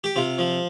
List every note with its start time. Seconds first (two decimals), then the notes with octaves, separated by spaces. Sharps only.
0.04 G4
0.16 C3 F4
0.38 F3